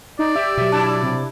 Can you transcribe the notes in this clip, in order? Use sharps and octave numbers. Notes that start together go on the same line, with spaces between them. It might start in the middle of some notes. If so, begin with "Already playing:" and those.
D#4 D5
G4 E5
B2 F#3 E5
D4 E4 A5
C3